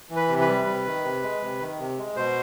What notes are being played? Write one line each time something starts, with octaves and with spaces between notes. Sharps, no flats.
E3
B4
C3
B4
G3
C3
D#3
C3
G#3
C3
D#3
C3
G#3
B2 C5